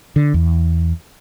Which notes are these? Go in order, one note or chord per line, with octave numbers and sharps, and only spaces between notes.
D3
E2